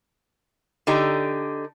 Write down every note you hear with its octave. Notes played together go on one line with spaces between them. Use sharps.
D3 D#4 G4 A#5